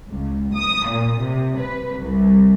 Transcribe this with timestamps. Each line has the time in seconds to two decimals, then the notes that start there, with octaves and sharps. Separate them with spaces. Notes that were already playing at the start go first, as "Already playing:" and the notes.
0.10 C#2
0.54 D#6
0.88 A#2
1.21 C3
1.59 B4
1.98 C2